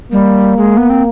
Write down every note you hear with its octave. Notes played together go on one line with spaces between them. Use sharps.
G3 A#3
G#3
B3
C4